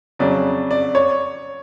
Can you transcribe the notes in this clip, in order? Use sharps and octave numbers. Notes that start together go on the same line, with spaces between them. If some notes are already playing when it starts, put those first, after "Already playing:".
F2 C#3 F#3 D5
D5
C#5